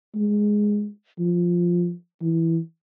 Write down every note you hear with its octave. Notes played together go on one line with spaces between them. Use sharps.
G#3
F3
E3